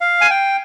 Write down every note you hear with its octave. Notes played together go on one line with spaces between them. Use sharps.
F5
G#5
G5